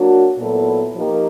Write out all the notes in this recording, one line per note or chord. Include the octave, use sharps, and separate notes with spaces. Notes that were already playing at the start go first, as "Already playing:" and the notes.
Already playing: F#3 A#3 D4 F#4
A#2 F#3 B3 E4 A4
F3 A#3 D#4 G4